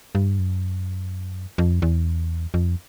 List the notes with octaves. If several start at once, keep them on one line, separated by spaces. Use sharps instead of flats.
G2
F#2
F2
E2
F2